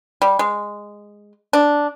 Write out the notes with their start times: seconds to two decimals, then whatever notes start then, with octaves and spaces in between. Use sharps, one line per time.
0.22 G3
0.39 G#3
1.53 D4